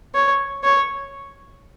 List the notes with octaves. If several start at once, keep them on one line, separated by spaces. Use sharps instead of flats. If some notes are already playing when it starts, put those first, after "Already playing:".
C#5
C#5